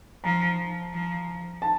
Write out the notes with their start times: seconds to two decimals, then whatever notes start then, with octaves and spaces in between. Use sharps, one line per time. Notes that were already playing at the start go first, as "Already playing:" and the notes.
0.24 F3 A#5
0.93 F3
1.62 A5